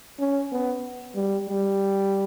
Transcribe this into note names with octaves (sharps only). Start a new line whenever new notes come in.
C#4
B3
G3
G3